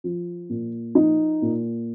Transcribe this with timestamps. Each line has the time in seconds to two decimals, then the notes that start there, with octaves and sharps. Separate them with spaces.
0.04 F3
0.50 A#2
0.95 F3 D#4
1.42 A#2